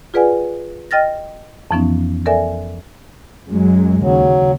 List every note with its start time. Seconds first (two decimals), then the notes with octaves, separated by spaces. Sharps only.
0.14 F4 G#4 B4 D5 F#5 G#5
0.91 D#5 G5 F6 A6 A#6
1.71 F2 E3 F3 B3 C#4 D#4
2.26 A4 A#4 D5 E5 G#5
3.48 F#2 F#3 G#3
4.01 D#2 C#3 F#3